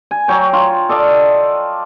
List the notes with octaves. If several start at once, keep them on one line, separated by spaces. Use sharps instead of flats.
G#5
F#3 C#5 G5
F4
A4 D5 D#5 F5